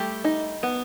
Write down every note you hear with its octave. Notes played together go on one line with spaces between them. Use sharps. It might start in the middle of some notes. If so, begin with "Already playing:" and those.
Already playing: G3 A3 G4
D#4
B3